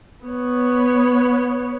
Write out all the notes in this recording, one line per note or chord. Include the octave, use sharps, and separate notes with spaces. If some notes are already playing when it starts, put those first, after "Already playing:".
B3 C#5